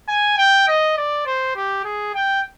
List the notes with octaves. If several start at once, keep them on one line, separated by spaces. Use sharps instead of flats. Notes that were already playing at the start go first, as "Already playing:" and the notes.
G#5
G5
D#5
D5
C5
G4
G#4
G5